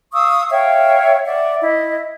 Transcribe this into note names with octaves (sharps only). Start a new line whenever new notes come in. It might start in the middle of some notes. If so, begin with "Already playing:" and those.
F5 C#6 D#6 E6
C#5 E5 F5 G5
D5 E5 F#5
E4 D#5